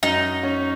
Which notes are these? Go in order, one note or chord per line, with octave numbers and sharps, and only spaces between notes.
F#2 D#4
C#4